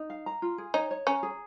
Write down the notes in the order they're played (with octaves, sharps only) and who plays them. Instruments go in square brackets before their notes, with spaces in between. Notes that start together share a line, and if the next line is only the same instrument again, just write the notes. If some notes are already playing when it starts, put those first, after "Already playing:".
Already playing: [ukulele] D#4
F5
A#5
F4
G#4
[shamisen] D#4 [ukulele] C#5
[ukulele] C#5
[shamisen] C#4 [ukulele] A#5
[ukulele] G#4